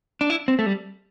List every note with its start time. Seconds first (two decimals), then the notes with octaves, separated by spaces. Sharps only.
0.21 D4
0.30 E4
0.48 C4
0.59 A3
0.66 G3